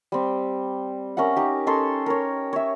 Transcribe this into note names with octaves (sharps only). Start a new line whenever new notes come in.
G3 C4
C#4 A#4 E5 F#5
D#4 G4
C#4 D#4 A4 C6
A#4 C#5
C#5 E5